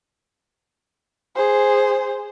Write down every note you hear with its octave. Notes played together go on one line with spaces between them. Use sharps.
G#4 C5